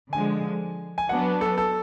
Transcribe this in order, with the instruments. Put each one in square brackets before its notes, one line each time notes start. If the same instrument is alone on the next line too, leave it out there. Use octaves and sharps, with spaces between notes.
[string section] D3 F3 G#3 [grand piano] G#5
[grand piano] G#5
[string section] F#3 B3 D4 F#4 [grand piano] F#5
[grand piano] A4
A4